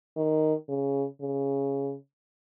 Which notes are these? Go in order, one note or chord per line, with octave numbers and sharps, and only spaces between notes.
D#3
C#3
C#3